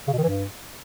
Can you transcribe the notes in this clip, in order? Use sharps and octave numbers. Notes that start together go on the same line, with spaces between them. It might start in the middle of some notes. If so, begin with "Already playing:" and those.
C#3
B2
D#3
E3
G2